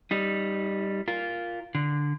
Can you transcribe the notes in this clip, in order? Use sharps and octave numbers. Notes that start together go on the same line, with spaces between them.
G3 D#4
F4 A#4
D3